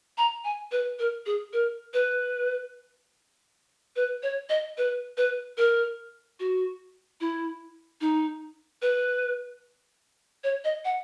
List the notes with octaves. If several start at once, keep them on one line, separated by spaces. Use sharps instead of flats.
A#5
G#5
B4
A#4
G#4
A#4
B4
B4
C#5
D#5
B4
B4
A#4
F#4
E4
D#4
B4
C#5
D#5
F#5